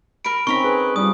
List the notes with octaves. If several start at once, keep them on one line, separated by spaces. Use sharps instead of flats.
A#4 B5 D7
C4 C#4 D#4 A#4 A#5 B5 C#6
G#4 B4
G3 D4 F4 D#6